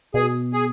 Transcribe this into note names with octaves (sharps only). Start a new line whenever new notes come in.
B2 G#4
G#4